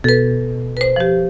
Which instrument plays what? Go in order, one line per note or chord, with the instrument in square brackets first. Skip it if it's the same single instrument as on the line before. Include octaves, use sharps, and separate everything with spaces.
[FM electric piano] B2 [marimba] A4 B4
[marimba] B4 C5
F3 G4